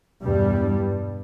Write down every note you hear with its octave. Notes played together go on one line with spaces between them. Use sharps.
E2 G2 B2 G3
G2